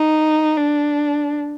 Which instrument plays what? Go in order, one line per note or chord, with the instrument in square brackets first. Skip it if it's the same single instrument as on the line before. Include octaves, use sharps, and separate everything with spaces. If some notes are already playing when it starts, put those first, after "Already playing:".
Already playing: [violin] D#4
D4